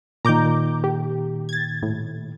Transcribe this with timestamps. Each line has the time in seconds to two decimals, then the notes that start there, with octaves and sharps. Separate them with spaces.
0.25 A#2 D#3 A#5 D6 G6
0.84 G4
1.49 G#6 A6
1.82 A2